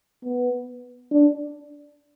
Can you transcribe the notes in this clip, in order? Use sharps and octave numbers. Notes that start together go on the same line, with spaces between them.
B3
D4